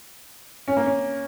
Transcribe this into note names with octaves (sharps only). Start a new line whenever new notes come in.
C#4
A#3
C#4